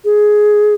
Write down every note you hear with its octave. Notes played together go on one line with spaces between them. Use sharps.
G#4